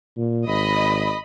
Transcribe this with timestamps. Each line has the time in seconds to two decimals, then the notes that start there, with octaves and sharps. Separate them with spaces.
0.17 A#2
0.47 G#1 D#5 B5